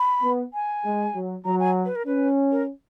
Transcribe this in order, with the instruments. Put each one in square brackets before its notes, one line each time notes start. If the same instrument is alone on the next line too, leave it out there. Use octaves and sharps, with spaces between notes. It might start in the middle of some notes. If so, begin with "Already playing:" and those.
Already playing: [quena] B5
[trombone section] B3
[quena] G#5
[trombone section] G#3
F#3
[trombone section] F#3 [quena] A#5
[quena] G#5
B4
A#4
[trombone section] C#4 [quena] B4
[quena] A#4